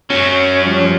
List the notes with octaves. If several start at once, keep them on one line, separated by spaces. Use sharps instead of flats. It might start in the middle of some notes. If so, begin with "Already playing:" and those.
F#2 F#3 C#4
F3 G3